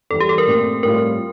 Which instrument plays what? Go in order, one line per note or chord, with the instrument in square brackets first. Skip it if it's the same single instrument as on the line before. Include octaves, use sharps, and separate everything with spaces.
[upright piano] E2 E3 G3 [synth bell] A4
[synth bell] G4
A4
A#4
[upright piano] A#2 A3 C4
[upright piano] A2 G3 C4 F4 [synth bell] A#4